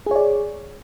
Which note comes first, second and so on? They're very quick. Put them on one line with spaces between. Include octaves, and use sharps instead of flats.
G#4 C#5 D5